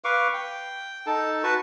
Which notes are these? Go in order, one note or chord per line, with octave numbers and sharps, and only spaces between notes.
B4 F5 C#6 D6
G5
D#4 A4 A5
F#4 B4 A5 C#6